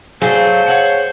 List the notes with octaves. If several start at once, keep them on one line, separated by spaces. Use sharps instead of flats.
F#3 A3 G#4 C5 D5 F5
C#5 F#5